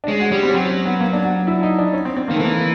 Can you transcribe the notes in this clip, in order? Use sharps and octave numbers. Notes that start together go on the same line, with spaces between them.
D4
G#3 C#4
F#4
G3 C#4
C4
C#4
F#3 C4
C#4
B3
A#3
D4
F#4
E4
D#4
D4
C#4
C4
C4
D#3 A#3
A3
E3
A#3